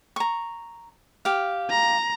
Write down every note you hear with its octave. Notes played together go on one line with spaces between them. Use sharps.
A#5 C#6
G4 F5
A#5